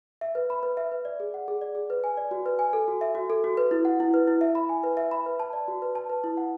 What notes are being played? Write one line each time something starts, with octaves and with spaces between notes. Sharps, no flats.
E5
B4
B5
B4
E5
B4
D5
G#4
F#5
G#4
D5
G#4
B4
G#5
D5
F#4
B4
G#5
A4
F#4
E5
F#4
A4
F#4
B4
E4
F#5
E4
B4
E4
E5
B5
G#5
B4
E5
B5
B4
A5
D5
F#4
B4
A5
B4
E4
F#5